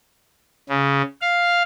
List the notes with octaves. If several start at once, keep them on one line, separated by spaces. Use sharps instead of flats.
C#3
F5